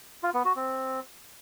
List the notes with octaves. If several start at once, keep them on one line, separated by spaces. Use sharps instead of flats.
F4
B3
F#4
C4